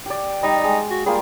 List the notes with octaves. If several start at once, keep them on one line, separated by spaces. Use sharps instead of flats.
G4 D5
G3 D#4
G#3
F#4
G3 A#3 F4 G#4